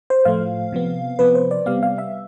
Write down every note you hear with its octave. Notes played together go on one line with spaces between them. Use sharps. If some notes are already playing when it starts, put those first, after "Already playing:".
C5
A2 F3 A3 F5
C3 F3 B3
C3 F3 B3 B4
C5
D5
C3 G3 B3 F5
F5
E5